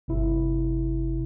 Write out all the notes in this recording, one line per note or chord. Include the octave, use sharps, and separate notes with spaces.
G1 C3 E4